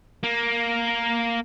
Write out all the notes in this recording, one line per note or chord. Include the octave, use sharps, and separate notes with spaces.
A#3